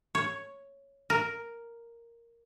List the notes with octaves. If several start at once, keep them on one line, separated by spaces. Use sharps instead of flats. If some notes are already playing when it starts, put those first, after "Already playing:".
C#5
A#4